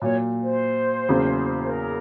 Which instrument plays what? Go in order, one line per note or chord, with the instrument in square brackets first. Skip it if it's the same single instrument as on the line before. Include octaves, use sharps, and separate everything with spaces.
[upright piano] A#2 F#3 A#3 [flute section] C#5
[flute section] C5
[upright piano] E2 C#3 F#3 A#3 C#4
[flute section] A#4